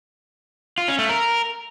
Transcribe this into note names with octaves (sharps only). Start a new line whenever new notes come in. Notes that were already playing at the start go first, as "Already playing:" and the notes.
F4
C#4
A3
A#4